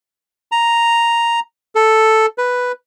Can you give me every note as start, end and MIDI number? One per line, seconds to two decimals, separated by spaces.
0.52 1.40 82
1.75 2.26 69
2.38 2.72 71